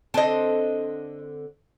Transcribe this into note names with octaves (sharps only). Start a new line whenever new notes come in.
D3 C4 D#5 A5